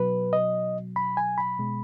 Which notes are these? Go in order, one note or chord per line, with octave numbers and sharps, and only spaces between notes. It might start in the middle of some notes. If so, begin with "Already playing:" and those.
Already playing: B2 F#3 B4
D#5
B5
G#5
B5
B2 G#3